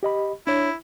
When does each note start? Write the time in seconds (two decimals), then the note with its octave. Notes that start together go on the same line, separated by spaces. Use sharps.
0.03 G4 D#5 B5
0.47 D4 E4 C#5